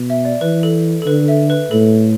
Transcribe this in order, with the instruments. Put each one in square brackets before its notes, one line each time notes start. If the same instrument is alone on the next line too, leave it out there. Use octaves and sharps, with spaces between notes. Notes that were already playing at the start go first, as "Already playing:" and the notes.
Already playing: [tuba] B2
[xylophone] E5
D5
[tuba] E3 [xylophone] B4
[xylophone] A4
A4
[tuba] D3 [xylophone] B4
[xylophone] E5
B4
[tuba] A2 [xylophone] A4